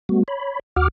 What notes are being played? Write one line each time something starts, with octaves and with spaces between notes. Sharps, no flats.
G3 A3 B3 F#4
C#5 B5
D#2 F#4 F#5 D6 F6